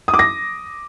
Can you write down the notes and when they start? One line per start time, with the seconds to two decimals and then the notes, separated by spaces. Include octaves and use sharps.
0.08 D#6
0.14 D6
0.19 A#6